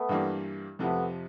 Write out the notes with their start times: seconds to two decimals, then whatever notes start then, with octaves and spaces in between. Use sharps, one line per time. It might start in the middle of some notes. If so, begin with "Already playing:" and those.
Already playing: A3 B3
0.09 G2 E3 G3 A#3 D4
0.79 F2 C3 F3 A3 B3